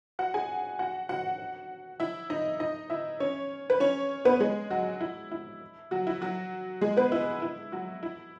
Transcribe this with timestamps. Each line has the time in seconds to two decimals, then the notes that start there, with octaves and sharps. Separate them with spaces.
0.19 F#4 F#5
0.34 G#4 G#5
0.79 F#4 F#5
1.09 F#4 F#5
2.00 E4 E5
2.30 D#4 D#5
2.60 D#4 D#5
2.90 E4 E5
3.20 C#4 C#5
3.70 B4
3.80 C#4 C#5
4.25 B3 B4
4.40 G#3 G#4
4.70 F#3 F#4
5.01 E4
5.31 E4
5.91 F#3 F#4
6.07 E4
6.21 F#3 F#4
6.81 G#3 G#4
6.97 B3 B4
7.12 E4
7.42 E4
7.72 F#3 F#4
8.03 E4